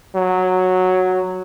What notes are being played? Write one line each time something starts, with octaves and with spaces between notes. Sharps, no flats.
F#3